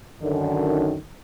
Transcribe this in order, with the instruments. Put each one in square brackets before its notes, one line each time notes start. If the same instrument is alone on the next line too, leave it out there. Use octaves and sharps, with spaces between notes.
[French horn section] F#2 D3 D#3